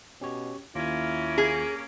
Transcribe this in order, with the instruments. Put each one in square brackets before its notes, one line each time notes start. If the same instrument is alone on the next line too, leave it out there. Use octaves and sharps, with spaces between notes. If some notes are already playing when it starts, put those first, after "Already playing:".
[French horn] B2 [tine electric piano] C#4 G4 C#5
[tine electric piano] D#2 F4 [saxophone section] A#3 C#4 [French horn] E4
[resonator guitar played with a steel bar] G#4